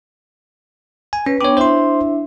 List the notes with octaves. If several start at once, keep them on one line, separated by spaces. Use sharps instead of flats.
G#5
C#4 B4
B3 D4 C#5 G5 D6
D4 E4 C5 E5 C6